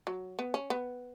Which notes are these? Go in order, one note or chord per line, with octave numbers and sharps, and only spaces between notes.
F#3
B3
C#4
B3